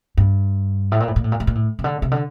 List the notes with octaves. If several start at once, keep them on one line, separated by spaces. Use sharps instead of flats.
G2
A2
A#2
A2
A#2
A2
A#2
A2
A#2
A2
C3
D3
C3
D3